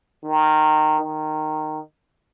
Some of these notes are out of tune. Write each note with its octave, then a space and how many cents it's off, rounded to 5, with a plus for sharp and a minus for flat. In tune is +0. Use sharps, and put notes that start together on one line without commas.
D#3 -15
D#3 -10